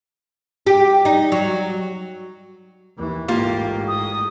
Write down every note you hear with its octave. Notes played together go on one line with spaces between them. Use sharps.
G4
D#4
F#3
D#2 E3
A1 G#2 A#3 F4 G4
D#6